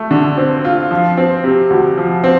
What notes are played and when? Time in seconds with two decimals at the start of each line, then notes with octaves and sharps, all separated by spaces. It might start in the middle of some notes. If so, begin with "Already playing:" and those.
Already playing: A3
0.11 D3
0.37 C4
0.65 F4
0.91 F3
1.17 C4
1.44 C3
1.70 D2
1.98 F3
2.24 C4